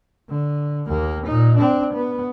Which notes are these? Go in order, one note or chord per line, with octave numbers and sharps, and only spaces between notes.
D3
D#2 A#3
A#2 D#4
C4 D4
B3